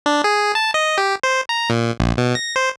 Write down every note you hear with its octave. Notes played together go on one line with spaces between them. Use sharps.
D4
G#4
A5
D#5
G4
C5
A#5
A#2
A#1
B2
A#6
C5